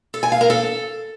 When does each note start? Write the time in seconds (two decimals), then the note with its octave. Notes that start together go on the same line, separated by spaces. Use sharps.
0.14 A4
0.23 G#5
0.32 F5
0.41 A#4
0.50 A4